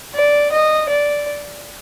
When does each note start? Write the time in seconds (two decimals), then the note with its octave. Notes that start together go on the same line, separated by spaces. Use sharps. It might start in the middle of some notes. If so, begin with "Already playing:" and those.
0.15 D5
0.52 D#5
0.89 D5